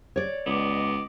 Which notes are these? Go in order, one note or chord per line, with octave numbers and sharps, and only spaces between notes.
C#5 D5
C#2 B3 D#5 D6